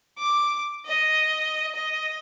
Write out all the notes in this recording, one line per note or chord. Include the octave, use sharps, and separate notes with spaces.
D6
D#5
D#5